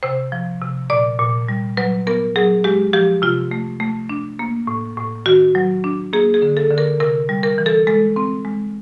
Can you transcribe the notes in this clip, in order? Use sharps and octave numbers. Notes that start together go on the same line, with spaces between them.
C3 C5
F3
C3
A#2 D5
A#2
G3
F#3 B4
B3 A#4
F#3 G#4
G#3 G4
F3 G4
C3 F4
A3
A3
D4
A#3
A2
A2
D#3 F#4
F#3
D4
A#3 G#4
G#4
D3
A4
D3
A#4
C3 A#4
G3
A#4
E3
A4
G#3 A4
C4
G#3